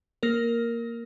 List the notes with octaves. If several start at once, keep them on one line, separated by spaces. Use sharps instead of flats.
A#3 A#4